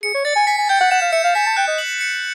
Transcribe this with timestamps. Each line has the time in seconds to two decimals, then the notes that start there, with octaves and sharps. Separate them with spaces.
0.03 G#4 C#7
0.14 C#5
0.25 D5 A6
0.36 G#5
0.47 G#5 B6
0.58 G#5
0.69 G5 G6
0.81 F#5
0.91 F#5 E7
1.01 F5
1.12 E5 C#7
1.24 F5
1.35 G#5 B6
1.46 A5
1.56 G5 F#6
1.68 D#5
1.78 F#7
2.01 C#7